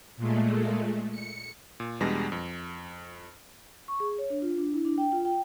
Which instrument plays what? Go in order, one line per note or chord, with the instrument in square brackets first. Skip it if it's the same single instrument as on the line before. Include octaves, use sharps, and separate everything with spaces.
[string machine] A#2 G#3 A3
C#7
[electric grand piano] A#2
E2 B2 G3 G#3 D4 A#6
F2
[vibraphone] C#6
G#4
C#5
D4
F4
D4
E4
D4
G5
F4
G5